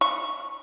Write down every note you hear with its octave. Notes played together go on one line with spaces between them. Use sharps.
C#6